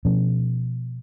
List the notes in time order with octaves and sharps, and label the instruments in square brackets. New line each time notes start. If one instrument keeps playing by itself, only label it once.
[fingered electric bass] B2 F3 C#4